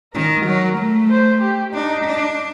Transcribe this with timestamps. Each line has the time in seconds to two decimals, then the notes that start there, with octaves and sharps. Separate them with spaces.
0.14 D#3 A#4
0.46 F#3
0.77 A3
1.10 C5
1.41 G4
1.73 D4 D#4
2.05 D4